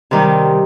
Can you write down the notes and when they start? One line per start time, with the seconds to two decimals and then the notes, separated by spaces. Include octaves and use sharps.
0.11 C3 D#3 G3